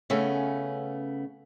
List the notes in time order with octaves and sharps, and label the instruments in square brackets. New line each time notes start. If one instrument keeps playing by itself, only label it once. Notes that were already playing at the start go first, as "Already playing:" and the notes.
[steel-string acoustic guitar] C#3 A3 B3 C#4